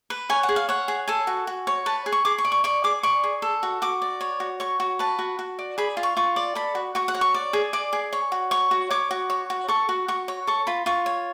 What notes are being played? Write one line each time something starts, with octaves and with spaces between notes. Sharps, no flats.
B4
C#5 G#5
F#5
G#4
F5
C#5 F#5
G#4
A4 G#5
F#4
F#4
C#5
B4 A5
G#4
C#6
G#4 D6
C#6
D5
C#6
D5 C#6
G#4 D6
D5 C#6
G#4
A4
F#4
F#4 D6
D5
C#5
F#4
C#5 C#6
F#4
B4 A5
F#4
F#4
D5
G#4 B5
F4
C#6
F4 C#6
D5
A4 B5
F#4
F#4 C#6
F#5
C#5
C#6
D5
G#4
D5 D6
G#4
C#5
F#4
C#5 C#6
F#4
C#5 D6
F#4
C#5
F#4
A4 C#6
F#4
F#4 C#6
C#5
A4 C#6
F4 B5
F4 C#6
C#5